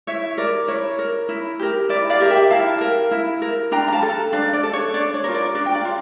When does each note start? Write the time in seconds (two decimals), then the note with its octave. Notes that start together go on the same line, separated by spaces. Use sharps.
0.07 E4 C#5 E5
0.38 A#4 D5
0.68 E4 C#5
0.99 A#4
1.29 E4
1.59 G4 A#4
1.89 E4 D5
2.10 D5 F5
2.20 G4 A#4
2.30 E5 G5
2.50 E4 F5 A5
2.81 A#4
3.11 E4
3.42 A#4
3.72 D4 G5 A#5
3.88 A#5
3.92 F5 A5
4.02 A4
4.33 D4 D5 F5
4.53 D5
4.63 A4
4.73 C#5
4.94 D4 D5
5.14 C#5
5.24 F4 A#4
5.34 D5
5.55 D4 D5
5.66 G5
5.75 D5 F5
5.85 F4